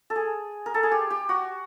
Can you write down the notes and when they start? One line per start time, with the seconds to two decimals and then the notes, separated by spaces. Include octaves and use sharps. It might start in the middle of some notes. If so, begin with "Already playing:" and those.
0.10 A4
0.16 G#4
0.66 A#4
0.74 A4
0.83 G#4
0.91 G4
1.10 G4
1.29 F#4